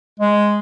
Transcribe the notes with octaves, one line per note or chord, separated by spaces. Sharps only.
G#3